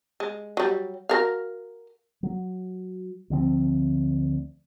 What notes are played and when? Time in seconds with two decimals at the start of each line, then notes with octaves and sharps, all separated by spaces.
0.20 G#3
0.57 F#3 G3
1.09 F#4 A#4 F5
2.23 F#3
3.30 D2 F3 B3 C4